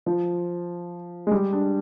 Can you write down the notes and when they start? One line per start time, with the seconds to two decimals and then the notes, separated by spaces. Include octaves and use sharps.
0.06 F3
1.27 G#3
1.31 G3
1.53 D4